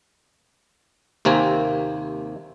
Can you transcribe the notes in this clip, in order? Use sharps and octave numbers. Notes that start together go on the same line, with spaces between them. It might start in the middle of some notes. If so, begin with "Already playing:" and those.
D#2 C3 A#3 C4 G#5